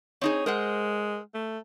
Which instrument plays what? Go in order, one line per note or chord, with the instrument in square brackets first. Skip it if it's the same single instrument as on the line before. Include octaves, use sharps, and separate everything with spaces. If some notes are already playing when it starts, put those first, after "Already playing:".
[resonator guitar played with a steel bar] C4 D#4 G#4 [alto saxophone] C#5
[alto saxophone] G#3 [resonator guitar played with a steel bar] A#4 C5 F#5
[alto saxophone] A3